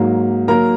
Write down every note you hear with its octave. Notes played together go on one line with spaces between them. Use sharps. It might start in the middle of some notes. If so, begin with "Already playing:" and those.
Already playing: G#2 F#3 A#3
F#3 A#3 A#4 A#5